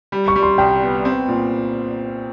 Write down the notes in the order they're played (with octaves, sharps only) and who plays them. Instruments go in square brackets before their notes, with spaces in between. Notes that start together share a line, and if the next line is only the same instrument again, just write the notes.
[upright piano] G3
[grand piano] C#6
[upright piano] G3
[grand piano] C6
[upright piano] C2 [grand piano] G5
[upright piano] B3
C4
A#2